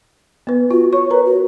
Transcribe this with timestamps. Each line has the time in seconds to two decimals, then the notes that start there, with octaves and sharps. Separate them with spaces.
0.47 B3 B4
0.71 F4 F#4
0.93 C#5 C#6
1.10 A#4 B4 A#5
1.26 F#4